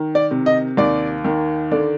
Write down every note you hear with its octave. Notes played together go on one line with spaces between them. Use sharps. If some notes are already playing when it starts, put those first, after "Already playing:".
Already playing: D#3
D5
C3
D#5
D#2 D5
D#3
D3 D5